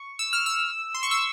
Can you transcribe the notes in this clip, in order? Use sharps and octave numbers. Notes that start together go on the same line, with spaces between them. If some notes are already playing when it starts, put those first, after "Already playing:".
Already playing: C#6
E6
F6
E6
C6
C#6
E6